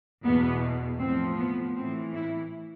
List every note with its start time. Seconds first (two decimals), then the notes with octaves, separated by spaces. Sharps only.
0.23 E2 B2 B3
0.99 A2 F3 C4
1.38 B3
1.76 A2 E3 C4
2.14 E4